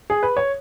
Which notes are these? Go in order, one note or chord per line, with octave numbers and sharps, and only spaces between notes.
G#4
B4
C#5